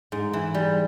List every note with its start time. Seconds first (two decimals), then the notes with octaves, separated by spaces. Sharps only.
0.12 G#2
0.33 E3
0.54 G3